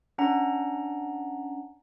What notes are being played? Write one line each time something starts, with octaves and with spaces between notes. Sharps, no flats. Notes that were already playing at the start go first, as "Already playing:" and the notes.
C#4 D4 F#5 A#5